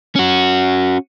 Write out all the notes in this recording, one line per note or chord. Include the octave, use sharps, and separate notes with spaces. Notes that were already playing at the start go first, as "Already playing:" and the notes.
C#4 F#4